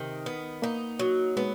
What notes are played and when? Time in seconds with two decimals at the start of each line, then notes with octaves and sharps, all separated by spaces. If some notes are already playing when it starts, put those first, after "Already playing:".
Already playing: C3 D#3
0.26 B3
0.62 A#3 D#4
0.99 F#3
1.36 G#3 B3